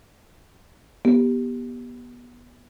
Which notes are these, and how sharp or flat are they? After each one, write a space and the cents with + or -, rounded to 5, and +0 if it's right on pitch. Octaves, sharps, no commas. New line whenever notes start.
B3 -20 G4 +0